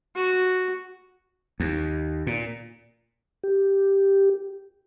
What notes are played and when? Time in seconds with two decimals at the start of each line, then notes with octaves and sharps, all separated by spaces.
0.16 F#4
1.60 D#2
2.27 A#2
3.44 G4